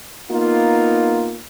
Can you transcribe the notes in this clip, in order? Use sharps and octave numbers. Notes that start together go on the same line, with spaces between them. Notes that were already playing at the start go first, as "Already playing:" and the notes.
A#3 B3 D#4 F4